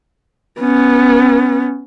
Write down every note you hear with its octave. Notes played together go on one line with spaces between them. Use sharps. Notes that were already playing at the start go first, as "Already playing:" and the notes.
B3 C#4